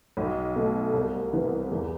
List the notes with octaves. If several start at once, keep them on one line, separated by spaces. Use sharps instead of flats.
B1
B2 A3
C2
C3 E3 B3
E2